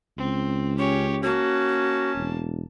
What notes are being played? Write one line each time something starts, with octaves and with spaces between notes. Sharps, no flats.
C#2 C4
C#4 G4 C#5
A#3 C#4 F#4 A5
E1